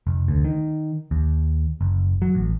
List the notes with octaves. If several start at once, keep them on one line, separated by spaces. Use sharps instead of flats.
F1
D2
D#3
D#2
F#1
F#3
A1